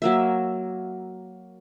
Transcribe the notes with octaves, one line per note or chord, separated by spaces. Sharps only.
F#3 A#3 E5